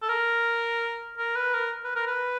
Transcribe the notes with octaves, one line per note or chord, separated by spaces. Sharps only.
A4
A#4
A#4
B4
A#4
B4
A#4
B4